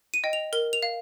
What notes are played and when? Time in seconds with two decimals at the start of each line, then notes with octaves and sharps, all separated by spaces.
0.14 D#7
0.24 D#5 G5
0.33 F7
0.53 A#4 G7
0.73 F7
0.83 F5